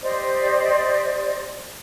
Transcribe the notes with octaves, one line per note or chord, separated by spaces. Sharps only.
G4 C5 D5 D#5